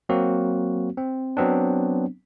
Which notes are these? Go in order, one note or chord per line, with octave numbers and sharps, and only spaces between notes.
F#3 A#3 C4 F#4
C4
F#3 B3 C4 D4